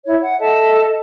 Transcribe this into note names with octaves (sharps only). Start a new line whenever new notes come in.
E4 C#5
F#5
A4 D#5 E5 A5